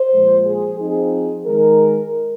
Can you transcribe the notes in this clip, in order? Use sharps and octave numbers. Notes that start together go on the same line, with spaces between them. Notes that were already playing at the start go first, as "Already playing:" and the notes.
Already playing: C5
A#2 F3 G#3
G#4
F3 C4 D#4 G#4
D#3 G#3 D#4 A#4